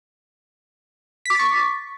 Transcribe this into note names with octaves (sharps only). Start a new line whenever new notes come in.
C#6 D6 A6 B6